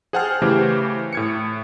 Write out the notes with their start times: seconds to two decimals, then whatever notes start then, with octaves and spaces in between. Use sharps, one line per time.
0.13 G#4 C5 F#5 G5 A5 F6
0.42 C#3 E3 A3 G4 C5
1.13 A2 G#6 C#7